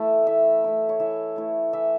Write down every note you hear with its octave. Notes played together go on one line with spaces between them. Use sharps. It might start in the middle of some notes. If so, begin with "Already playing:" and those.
Already playing: E3 A3 E4 A5
E3 E5
A3 E4
C#5
E3 E5
A3 E4
E3 E5